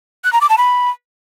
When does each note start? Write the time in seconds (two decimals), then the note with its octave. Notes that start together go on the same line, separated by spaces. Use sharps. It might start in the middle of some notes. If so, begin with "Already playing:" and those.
0.24 F#6
0.33 A#5
0.41 D6
0.49 A5
0.58 B5